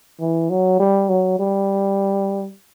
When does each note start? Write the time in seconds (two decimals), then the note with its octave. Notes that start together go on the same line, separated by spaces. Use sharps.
0.20 E3
0.50 F#3
0.79 G3
1.09 F#3
1.39 G3